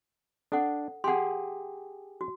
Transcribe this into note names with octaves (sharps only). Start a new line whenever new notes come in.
D4 A4 F#5
G4 G#4 F#5 G5 C6
F#4